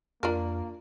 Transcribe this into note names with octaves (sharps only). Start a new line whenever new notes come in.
F2 A#3 D4 F4 A#4 A5